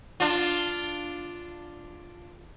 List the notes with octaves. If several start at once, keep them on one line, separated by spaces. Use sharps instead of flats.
D4 F4